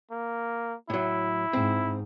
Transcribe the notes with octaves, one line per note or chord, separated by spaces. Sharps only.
A#3
A2 F#3 E4
G#2 C4